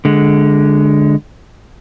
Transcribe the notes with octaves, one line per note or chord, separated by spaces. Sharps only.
D3 G#3